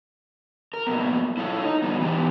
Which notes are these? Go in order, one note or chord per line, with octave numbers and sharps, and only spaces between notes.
A#4
F#3 A#3 B3
E4 F4 A4 C#5
D#4
F#3 G3 B3
E3 B3 G4